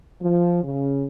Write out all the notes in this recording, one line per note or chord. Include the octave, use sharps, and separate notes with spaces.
F3
C#3